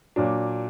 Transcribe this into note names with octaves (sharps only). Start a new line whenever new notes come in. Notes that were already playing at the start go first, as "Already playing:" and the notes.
A#2 F#3 D4